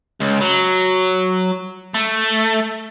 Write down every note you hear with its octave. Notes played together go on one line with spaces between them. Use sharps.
C#2
F#3
A3